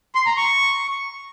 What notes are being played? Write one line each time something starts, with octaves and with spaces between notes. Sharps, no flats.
C6
A#5
C#6